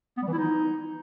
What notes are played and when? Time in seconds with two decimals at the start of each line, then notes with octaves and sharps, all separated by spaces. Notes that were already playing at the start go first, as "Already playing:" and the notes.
0.17 B3
0.23 G3
0.28 E3
0.33 E4
0.38 D#4